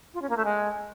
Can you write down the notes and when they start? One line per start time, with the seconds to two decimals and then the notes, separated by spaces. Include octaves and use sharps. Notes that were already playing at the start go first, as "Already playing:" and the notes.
0.14 F4
0.22 C#4
0.29 A#3
0.37 A3
0.45 G#3